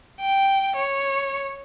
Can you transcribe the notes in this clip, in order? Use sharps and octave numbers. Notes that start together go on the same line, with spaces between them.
G5
C#5